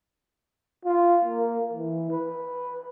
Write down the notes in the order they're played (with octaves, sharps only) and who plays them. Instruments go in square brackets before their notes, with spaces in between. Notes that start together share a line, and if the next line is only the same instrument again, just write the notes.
[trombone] F4
A#3
E3
B4